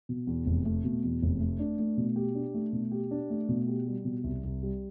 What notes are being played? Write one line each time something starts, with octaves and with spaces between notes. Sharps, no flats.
B2
E2
F1
A3
B2
E2
F1
A3
D4
A3
B2
G4
D4
A3
B2
G4
D4
A3
B2
G4
G3
B2
C2
C2
G3